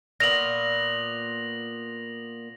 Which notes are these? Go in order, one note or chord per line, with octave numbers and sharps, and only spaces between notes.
A#2 B3 A#6 F7 F#7